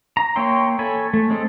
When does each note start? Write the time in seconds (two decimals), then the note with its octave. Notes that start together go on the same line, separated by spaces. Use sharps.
0.17 A#5
0.36 A#3 C#5 E5 G5 C6
0.79 A4 C#5 G#5 B5
1.14 A3
1.30 G#3 C4 A4